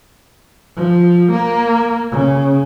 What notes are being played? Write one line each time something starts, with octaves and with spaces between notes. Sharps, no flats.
F3
A#3
C#3